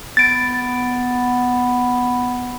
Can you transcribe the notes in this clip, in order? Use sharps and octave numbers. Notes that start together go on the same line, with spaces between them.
B3 A6 D7